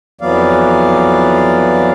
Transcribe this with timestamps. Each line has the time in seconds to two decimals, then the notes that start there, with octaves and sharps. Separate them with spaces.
0.21 F2 E3 F#3 B3 D5 F5